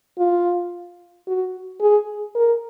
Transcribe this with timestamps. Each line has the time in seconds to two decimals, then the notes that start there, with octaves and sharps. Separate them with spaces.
0.18 F4
1.27 F#4
1.81 G#4
2.35 A#4